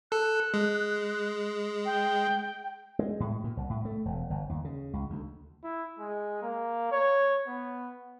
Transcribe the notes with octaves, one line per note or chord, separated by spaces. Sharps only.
A4 F#6
G#3
G5
G#3
A2
A#2
C2
A2
A3
E1
G1
D#2
C#3
C#2
D2
E4
G#3
A#3
C#5
B3